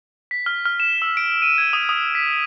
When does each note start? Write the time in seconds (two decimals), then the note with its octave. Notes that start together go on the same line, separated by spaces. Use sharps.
0.31 B6
0.46 F6
0.66 F6
0.80 E7
1.02 E6
1.17 D7
1.42 D#7
1.58 G#6
1.73 D#6
1.89 D#6
2.15 B6